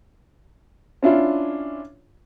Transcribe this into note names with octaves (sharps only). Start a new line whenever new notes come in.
C#4 D4 E4 F4